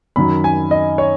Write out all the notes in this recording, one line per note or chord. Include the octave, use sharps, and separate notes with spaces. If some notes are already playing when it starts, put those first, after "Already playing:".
F#2 D#3 F#3 B5
G#5
D#5
C#5